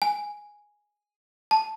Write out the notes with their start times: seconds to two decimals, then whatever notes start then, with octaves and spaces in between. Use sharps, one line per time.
0.02 G#5
1.51 A5